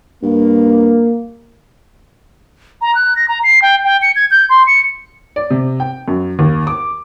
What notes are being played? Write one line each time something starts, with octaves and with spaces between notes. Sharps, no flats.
G2 A#3
A#5
F#6
A#6
A#5
C7
G5
G5
C#7
G#6
G6
C6
C#7
D5
C3
G5
F#2
D#2
D6